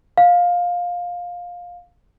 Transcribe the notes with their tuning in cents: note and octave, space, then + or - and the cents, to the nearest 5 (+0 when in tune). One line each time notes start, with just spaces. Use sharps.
F5 +15